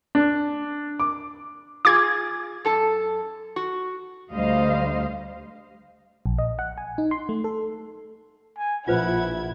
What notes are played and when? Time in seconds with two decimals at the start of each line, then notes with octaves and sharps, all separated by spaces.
0.15 D4
1.00 D6
1.85 F4 G#4 D6 G#6
2.65 F#2 A4 A5
3.56 F#4
4.33 D2 G3 C5 D#5 F5
6.26 A#1
6.38 D#5
6.59 F#5
6.78 G#5
6.98 D#4
7.11 C6
7.29 A3
7.44 A4
8.58 G#5
8.88 A#1 E4 F4 B4 C5 F#5 G#6